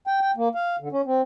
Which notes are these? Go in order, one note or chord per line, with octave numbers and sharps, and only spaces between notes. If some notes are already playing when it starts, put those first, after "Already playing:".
G5
G5
A#3
F5
D3
C#4
C4